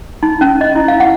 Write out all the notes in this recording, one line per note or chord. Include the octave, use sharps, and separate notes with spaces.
D#4
C#4
D#5
E4
F5
F#5